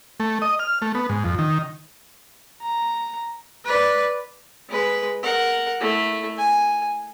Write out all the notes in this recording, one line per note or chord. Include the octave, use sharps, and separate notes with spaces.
A3
D#5
F6
A3
B3
G#2
F2
D#3
A#5
B4 D5
G#3 B4
A#4 F#5
A3 E4
G#5